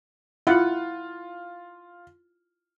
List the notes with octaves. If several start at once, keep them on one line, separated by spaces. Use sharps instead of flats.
E4 F4 F#5